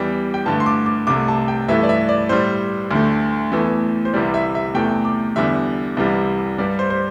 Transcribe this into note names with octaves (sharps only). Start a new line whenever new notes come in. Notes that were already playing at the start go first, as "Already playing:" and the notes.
Already playing: E2 E3 G3 G5
G5
G2 D3 A3 A5
C6
D6
D6
C2 C3 A3 D6
A5
G5
G2 E3 A3 E5
D5
E5
D5
A2 G3 C5
D2 D3 A3
E2 E3 A3
C5
C2 C3 E3 G3 D5
E5
E5
E2 C3 A3 G5
D6
E2 D3 G3 E5
C2 C3 E3 G3
G2 G3 D5
C5
C5